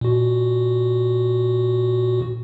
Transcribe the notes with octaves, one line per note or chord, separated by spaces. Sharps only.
A#2 F#4